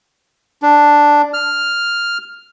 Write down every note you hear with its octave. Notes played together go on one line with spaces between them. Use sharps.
D4
F6